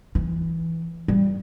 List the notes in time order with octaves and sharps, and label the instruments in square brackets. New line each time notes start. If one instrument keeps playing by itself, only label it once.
[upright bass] E3
G3